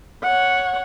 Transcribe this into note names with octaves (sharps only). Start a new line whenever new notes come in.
C#5 F#5